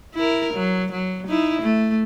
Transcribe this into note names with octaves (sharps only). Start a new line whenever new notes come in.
E4 A#4
F#3
F#3
D#4 E4
A3